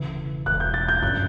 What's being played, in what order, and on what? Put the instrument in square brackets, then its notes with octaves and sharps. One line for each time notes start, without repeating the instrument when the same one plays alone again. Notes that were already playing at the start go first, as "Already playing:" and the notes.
Already playing: [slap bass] E1 D2 C#3 E3
[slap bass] E1 D2 C#3 E3 [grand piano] F#6
[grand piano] G6
A6
G6
[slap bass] G1 F#2 C#3 [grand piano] F#6